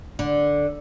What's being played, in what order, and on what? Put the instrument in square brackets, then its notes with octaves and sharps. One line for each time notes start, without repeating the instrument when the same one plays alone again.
[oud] D3